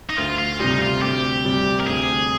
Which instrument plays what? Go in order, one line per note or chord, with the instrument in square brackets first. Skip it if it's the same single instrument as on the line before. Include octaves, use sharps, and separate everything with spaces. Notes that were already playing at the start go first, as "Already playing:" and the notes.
[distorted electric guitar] D#4
[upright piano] D2 [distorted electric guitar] F4
[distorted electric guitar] F4
[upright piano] C3 G3 [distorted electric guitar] D#4
[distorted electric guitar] F4
[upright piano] D2 [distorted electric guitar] G4
[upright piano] C3 G3
[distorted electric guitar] A#4
[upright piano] D2 [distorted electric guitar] G#4